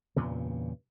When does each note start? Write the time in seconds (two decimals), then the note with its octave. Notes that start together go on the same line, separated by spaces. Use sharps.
0.16 E2 G2 A#2 C#3